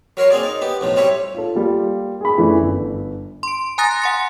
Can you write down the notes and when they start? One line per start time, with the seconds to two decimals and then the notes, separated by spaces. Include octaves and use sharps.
0.17 F#3 A#4 C#5 C6
0.30 A#3 C4 G#4 D5
0.43 D#4
0.61 B3 G4
0.81 B1 A2 F3
0.96 G3 C4 C#5 E5
1.34 F4 A4
1.55 G3 A#3 F4
2.21 G#4 B5
2.38 F#2 E3 A3 D4
2.62 G1
3.43 C6 D7
3.78 G#5 A#5 D#6 F#6 A6 A#6
4.02 F#5 C6 C#7